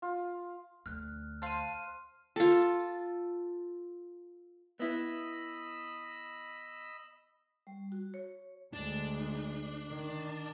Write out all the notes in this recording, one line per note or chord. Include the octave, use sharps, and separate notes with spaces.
F4
D2 F6 F#6
C5 F5 A5 F6 D#7
F4 A4
B3 E4 D#5 B5 E6
G3
F#4
C#5
D2 G#3 D4
D#3